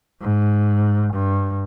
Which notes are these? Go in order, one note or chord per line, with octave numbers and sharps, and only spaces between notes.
G#2
G2